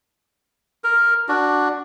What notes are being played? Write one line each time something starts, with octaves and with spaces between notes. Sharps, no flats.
A#4
D4 F#4